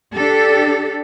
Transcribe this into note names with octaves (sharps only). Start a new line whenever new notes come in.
D4 G4 A4